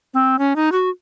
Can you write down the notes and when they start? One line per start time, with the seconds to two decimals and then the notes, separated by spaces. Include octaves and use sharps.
0.14 C4
0.39 C#4
0.56 D#4
0.72 F#4